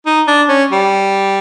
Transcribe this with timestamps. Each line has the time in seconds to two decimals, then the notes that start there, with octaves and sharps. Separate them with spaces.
0.06 D#4
0.27 D4
0.49 C#4
0.72 G3